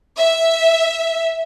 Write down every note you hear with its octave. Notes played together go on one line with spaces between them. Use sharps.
E5